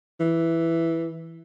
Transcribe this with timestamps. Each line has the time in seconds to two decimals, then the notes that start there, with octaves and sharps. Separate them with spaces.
0.20 E3